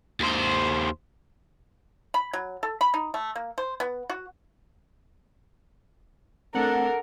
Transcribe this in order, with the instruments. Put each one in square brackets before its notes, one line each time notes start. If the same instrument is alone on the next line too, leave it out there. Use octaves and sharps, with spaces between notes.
[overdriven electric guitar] D#2 C5
[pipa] B5
F#3
A4
B5
D#4
A3
A#3
C5
B3
F#4
[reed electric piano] A3 C4 [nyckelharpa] D4 A4 [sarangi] A#4 [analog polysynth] F#5